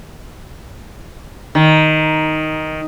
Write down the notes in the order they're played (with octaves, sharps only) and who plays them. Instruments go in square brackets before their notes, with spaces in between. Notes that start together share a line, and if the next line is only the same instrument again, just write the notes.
[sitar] D#3